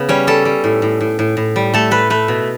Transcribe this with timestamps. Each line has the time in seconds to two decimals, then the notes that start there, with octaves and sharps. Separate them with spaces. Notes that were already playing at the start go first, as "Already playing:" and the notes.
Already playing: C#3 B3
0.09 G3 C#4
0.27 G3 A4
0.45 G3
0.64 A2
0.82 A2
1.01 A2
1.19 A2
1.37 A2
1.56 G3
1.74 A3 A4
1.91 A3 B4
2.10 A3 B4
2.28 B2